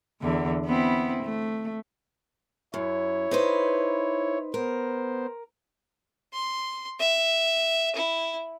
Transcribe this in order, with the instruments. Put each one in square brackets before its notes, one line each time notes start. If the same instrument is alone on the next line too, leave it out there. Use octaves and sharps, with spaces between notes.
[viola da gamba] E2 D3
B3 C4 E4
A3
[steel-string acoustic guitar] F#2 [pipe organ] E4 C#5
[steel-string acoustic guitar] D#4 B4 C5
[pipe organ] B3 C5 [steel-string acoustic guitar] A#4
[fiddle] C6
E5
E4